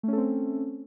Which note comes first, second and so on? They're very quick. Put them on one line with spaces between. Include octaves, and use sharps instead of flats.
A3 C#4 A4 C4